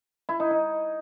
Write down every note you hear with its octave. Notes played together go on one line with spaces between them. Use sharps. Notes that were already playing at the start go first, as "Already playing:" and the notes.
E4
D#4
D#4